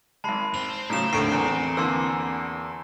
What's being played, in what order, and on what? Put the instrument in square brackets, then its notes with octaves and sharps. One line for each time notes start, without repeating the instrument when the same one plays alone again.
[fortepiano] G#1 G#3 [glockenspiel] A5 B5 C7
[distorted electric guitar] C4 C5 [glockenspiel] F7
[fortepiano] A2 C#3 F#3 [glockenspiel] A#5 E7
[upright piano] D#2 A2 D3 [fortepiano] A#4 [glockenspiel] C7 D7
[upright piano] E2
[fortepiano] D3 E3 A#3 [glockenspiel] A5 C6 E6